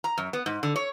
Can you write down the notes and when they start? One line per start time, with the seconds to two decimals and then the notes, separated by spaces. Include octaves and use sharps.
0.04 A#5
0.18 F#2
0.33 B3
0.46 G#2
0.63 D3
0.76 C#5